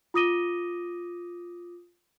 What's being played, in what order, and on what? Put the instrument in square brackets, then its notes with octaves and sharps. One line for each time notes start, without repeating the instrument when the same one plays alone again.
[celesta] F4 D6 D#6 A#6 D#7 G7